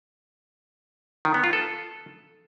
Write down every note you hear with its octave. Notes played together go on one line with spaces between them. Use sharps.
D#3
B3
F4
A4